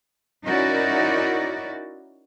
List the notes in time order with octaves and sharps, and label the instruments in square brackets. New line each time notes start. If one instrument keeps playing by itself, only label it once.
[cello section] C#4 D#4 E4 F#4 A#4 D5